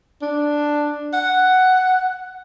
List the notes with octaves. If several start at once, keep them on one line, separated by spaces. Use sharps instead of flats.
D4
F#5